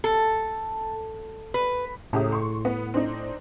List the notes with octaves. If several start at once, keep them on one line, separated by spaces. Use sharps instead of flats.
A4
B4
C#2 A2 G4 D#6
C6 C#6
B3
C4 D4 D#4